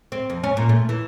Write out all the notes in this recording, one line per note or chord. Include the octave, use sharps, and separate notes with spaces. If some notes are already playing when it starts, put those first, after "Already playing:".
C4
F2
C#4
A#2
A3
E3